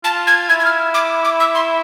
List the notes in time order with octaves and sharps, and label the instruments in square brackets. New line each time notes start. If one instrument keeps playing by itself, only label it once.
[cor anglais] F4 [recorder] A5
[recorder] G#6
[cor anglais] E4 [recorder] G#6
[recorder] G#6
F6
D6
D6
E6
C6